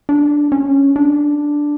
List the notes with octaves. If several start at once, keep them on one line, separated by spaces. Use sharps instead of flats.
D4
C#4
D4